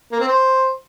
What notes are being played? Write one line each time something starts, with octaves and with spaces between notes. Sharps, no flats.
A#3
C4
C5